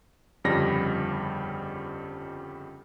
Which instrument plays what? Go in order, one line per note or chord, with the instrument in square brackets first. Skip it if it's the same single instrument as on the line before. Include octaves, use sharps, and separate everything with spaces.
[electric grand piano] G1 F2 C#3 G3 B5 A#6